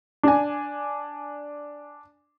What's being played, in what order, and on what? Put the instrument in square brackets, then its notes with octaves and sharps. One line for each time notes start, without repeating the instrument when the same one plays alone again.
[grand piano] D4 G#5